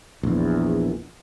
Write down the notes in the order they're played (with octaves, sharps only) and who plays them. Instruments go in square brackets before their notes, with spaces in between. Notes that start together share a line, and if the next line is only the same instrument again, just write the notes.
[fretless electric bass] A#1 E2